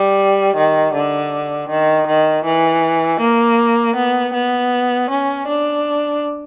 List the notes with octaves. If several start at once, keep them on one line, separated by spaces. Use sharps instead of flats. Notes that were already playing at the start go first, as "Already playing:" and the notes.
Already playing: G3
D#3
D3
D#3
D#3
E3
A#3
B3
B3
C#4
D4